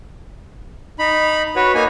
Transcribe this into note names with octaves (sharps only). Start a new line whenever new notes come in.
D#4 B5
F#4 B4 C#5
A#3 D#4 G#5